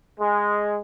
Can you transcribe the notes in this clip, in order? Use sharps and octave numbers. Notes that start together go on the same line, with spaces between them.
G#3